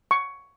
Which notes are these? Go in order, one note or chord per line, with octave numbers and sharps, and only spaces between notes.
C#6